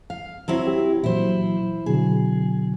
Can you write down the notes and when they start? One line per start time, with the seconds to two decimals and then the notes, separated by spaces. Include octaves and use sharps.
0.10 F5
0.48 F#3 C4 E4
0.67 G4
1.04 A#2 E3 F#3 E4 C5
1.86 B2 D3 F#3 G#4